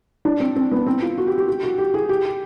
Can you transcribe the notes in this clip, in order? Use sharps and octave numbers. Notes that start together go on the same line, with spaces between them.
D4
C4
C4
B3
C4
F4
F#4
G4
G4
G4
F#4
G4
G#4
G4